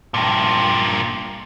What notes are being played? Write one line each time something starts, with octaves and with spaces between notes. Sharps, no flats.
G2 A#2